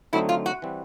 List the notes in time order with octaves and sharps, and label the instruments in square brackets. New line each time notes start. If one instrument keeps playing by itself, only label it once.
[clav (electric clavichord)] D3 F#3 A3 C4 D#4 [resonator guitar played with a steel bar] E4
[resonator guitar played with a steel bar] F4
F#4
[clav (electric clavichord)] E3 G3 C4